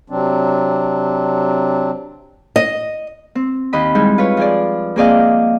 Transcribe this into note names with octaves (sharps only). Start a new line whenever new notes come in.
C3 F#3 C4 D4
D#5
C4
D#2 D#5 B5
G3 G#3 D#4 E4
F4 B4 C#5
F3 G#4 D5
A#3 C4 G#4 D5 D#5 F5